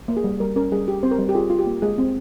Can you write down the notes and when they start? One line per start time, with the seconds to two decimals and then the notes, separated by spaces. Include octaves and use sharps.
0.08 A#3
0.17 G#4
0.24 G3
0.40 G3 A#4
0.56 C#4 A#4
0.71 G3 G#4
0.88 G4
1.03 C4 C5
1.11 A#4
1.19 G3
1.29 G4
1.35 F4 G#4
1.50 F4
1.59 G4
1.66 A#3
1.82 G#3 G#4
1.98 C4